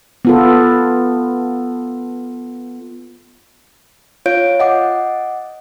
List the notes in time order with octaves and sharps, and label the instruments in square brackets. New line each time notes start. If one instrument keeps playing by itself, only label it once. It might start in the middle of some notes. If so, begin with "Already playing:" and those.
[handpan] B3 F4 A4
[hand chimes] F4 C#5 F5 G6 D7
D#5 F#5 D6